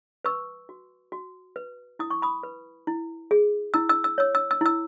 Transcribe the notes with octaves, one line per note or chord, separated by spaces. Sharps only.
B4 C#6 E6
F#4
F#4
B4
E4 D#6
C#6
B5 D#6
B4
E4
G#4
E4 E6
E6
E6
C#5 E6
E6
E6
E4 E6